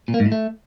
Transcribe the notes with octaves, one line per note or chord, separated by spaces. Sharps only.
A#2
A#3
G#2
A2
A3